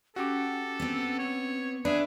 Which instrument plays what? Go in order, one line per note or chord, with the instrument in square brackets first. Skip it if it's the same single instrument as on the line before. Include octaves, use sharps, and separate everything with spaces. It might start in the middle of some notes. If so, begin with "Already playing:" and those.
[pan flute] C#4 [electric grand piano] F#4 G4 D6 [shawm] A4
[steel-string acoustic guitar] B3 C4
[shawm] C#5
[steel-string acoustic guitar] D4 [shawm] G#4 [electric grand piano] B4 E5